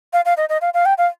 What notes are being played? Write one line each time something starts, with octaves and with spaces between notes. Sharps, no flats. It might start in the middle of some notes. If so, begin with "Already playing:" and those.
F5
F5
D#5
D#5
F5
F5
G5
F5